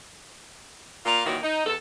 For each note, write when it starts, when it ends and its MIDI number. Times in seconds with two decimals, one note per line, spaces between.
1.06 1.22 46
1.06 1.22 65
1.06 1.22 77
1.26 1.37 46
1.26 1.37 51
1.26 1.37 52
1.26 1.37 54
1.26 1.37 58
1.26 1.37 66
1.44 1.65 63
1.66 1.75 40
1.66 1.75 69